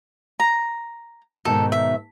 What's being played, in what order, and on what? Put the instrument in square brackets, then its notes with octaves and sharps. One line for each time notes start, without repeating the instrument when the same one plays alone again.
[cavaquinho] A#5
[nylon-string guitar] G#2 B2 D#3 [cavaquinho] A4
[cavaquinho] E5